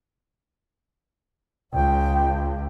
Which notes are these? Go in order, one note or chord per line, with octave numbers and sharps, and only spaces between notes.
C#2 G5